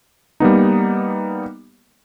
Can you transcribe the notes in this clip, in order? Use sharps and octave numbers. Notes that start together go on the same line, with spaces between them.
G3 A#3 B3 D#4